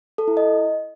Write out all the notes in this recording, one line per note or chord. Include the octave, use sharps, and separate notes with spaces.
A4
E4
D#5